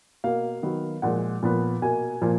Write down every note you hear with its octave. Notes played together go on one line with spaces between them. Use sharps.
B2 A#3 F5
D#3 F#3 B3
A#2 F3 G#3 F#5
A#2 F3 B3
B2 A#3 G#5
A#2 F3 A#3